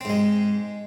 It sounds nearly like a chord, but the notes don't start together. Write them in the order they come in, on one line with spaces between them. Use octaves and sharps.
C4 G#2 G#3